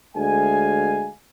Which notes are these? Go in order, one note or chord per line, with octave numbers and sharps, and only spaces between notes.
D2 G#3 F5 G#5